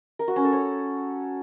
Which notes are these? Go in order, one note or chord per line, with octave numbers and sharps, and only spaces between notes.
A#4
F#4
C#4
A4
C#5